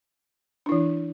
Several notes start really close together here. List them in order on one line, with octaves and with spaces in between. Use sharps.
D4 E4 E3